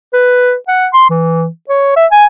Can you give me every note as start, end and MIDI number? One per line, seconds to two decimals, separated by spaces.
0.13 0.55 71
0.68 0.87 78
0.93 1.07 84
1.10 1.46 52
1.69 1.95 73
1.96 2.06 76
2.12 2.25 80